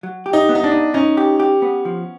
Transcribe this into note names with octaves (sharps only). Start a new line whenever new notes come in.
F#3
G4
D#4
B3
D#4
D4
D#4
C#4 D#4
G4
G4
B3
F3